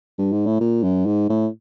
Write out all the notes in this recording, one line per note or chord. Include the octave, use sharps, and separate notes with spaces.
G2
G#2
A2
A#2
F#2
G#2
A2